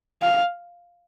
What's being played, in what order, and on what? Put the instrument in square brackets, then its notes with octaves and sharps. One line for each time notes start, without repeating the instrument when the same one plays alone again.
[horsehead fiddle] F5